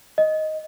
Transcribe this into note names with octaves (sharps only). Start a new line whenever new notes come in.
D#5